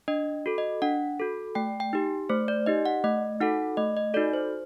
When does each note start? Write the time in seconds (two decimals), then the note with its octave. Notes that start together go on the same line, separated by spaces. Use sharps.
0.08 D4 D#5
0.46 F#4 A4
0.58 D#5
0.82 D4 F#5
1.20 F#4 A4
1.55 A3 G5
1.80 G5
1.93 D#4 G4
2.29 A3 C5
2.48 D5
2.66 D#4 G4 D#5
2.86 F#5
3.04 A3 D#5
3.41 D#4 F#4 A4 F#5
3.77 A3 D#5
3.97 D#5
4.14 D#4 F#4 A4 D5
4.33 C5